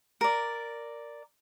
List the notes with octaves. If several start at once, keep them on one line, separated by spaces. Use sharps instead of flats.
A#4 D5